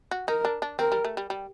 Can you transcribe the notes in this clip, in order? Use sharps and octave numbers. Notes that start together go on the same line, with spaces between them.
F#4
D#4 A#4
D4
D4
C4 A#4
G3
A3
G3
G3